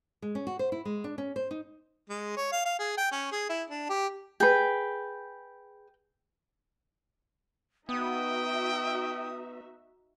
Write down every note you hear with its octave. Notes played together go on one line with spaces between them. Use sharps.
G#3
C#4
F#4
C5
E4
G#3
D4
C#4
C5
D#4
G#3
C#5
F5
F5
G#4
G5
C#4
G#4
E4
D4
G4
G#4 B4 G5
B3 D#4 F#4 E5 G5 D#6